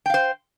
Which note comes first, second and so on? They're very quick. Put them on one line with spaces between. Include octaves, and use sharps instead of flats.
G5 F5 C5